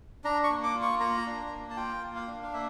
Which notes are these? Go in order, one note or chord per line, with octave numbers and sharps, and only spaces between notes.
D4 A#5
C#6
A#3
D6
F4
C#6
A#3 A#5
D4
A#3
A5
F4 G5
A#3
F5
D4
F5
A#3 E5